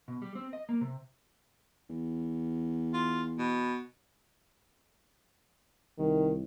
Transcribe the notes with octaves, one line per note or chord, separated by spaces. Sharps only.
B2
G3
C4
D#5
A#3
C3
E2
F4
B2
C2 D#3